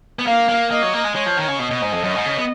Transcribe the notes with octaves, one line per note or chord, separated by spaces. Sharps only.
B3
A#3 F5
A#3
A#3 D#5
F#3
A#3
G#3
G#3 C#5
F3
D#3
C#3
B2 D#5
B2
G#2
F2
F#2
G#2
C#3
B3